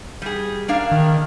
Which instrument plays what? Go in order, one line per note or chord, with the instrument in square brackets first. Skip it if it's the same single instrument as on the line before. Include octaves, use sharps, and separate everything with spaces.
[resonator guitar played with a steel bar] G3 G#4
A#3 D4 F5
[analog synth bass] D#3